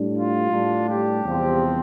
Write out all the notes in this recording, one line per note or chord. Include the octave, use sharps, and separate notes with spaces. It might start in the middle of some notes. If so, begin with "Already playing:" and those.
Already playing: A2 G3 D4
F4
A2 G3 D4
G3 G4
E2 C3 F3 C4